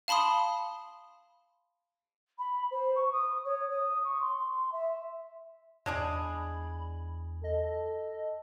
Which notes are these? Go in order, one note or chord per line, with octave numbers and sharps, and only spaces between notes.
F5 A5 B5 C6 D#6
B5
C5
C#6
D#6
C#5
D#6
C#6
C6
E5
E2 G#3 D4 G#4 B5
A4 D#5